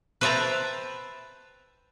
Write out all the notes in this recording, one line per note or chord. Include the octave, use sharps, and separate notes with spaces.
B4 C5 E5 G5 A5 A#5